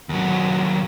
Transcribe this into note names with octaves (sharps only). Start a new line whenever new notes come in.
D#2 F#3